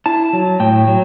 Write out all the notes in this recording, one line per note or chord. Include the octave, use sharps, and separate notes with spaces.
E4 A5
F#3
A2 G5
F#3